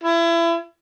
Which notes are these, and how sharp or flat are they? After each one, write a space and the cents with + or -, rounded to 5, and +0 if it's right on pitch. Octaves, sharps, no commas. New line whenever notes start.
E4 +30